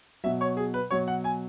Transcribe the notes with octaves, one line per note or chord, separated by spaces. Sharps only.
B2 F#3 E5
C#5
G#4
B4
B2 F#3 C#5
F#5
G#5